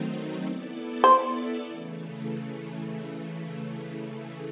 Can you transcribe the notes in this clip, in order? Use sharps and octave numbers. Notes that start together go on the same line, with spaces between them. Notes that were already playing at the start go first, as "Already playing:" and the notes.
Already playing: D#3 F#3 A3 C4 D#4
B3 E4 A4 D5
C5
C#3 E3 A3